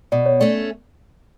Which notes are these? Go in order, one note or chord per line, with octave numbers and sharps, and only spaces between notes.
B2 D5
C#5
A3 C#4 D5